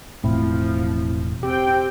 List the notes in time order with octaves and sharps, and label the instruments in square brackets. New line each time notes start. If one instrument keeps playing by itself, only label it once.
[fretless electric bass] E1 A2 [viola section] F3 [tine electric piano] C4 E4
[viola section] C4 G5 [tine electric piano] G4